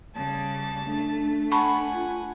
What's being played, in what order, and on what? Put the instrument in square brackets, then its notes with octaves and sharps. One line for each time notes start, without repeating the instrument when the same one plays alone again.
[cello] C#3 G3 [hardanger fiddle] A5
[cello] A3 [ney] D4
[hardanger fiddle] F#5 G#5 [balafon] A5 B5 C#6
[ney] F4